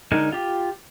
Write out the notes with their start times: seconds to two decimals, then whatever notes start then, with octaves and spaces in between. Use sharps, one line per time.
0.12 D3 G#3 D#4 A#4
0.32 F4 G4